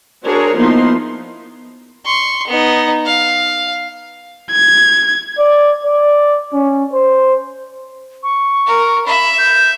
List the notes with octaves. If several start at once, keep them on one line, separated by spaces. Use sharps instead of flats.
D4 F#4 G#4 A#4 C5 C#5
F3 A#3 B3 D#4 E4 C6
C6 C#6
B3 D#4
F5
G#6
D5
D5
C#4
C5
C#6
A#4
E5 B5
G6